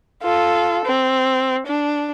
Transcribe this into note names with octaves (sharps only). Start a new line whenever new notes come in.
F4 A4
C4
D4